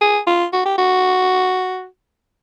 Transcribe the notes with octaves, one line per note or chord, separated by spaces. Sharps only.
G#4
F4
F#4
G4
F#4